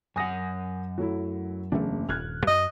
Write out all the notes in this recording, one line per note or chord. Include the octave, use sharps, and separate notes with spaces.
F#2 F#5 G#5 D#6 A#6
F#3 A3 E4
F#1 E2 A3 A#3 D4
D#1 G2 F6 F#6 G#6
F#2 D#5